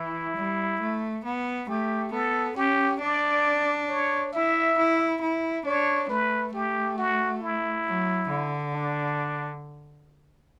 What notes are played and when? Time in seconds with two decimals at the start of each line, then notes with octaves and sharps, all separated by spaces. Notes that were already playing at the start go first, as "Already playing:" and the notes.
Already playing: E3 E4
0.36 G3
0.80 A3
1.24 B3
1.68 A3 G4
2.12 B3 A4
2.57 C#4 G4
3.01 D4 D5
3.89 C#5
4.33 E4 E5
4.78 E4
5.22 E4
5.66 D4 C#5
6.09 A3 B4
6.54 A3 G4
6.98 F#4
7.42 E4
7.86 F#3
8.30 D3
8.75 D4